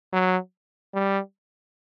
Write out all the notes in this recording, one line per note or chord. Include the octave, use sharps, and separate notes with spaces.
F#3
G3